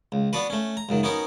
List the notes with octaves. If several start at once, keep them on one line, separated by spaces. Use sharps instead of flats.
C#2
B3 D4 F#4 B4
A3 C#4
A#5
C#2 F#2 D#3
B3 C#4 D#4 F#4 A#4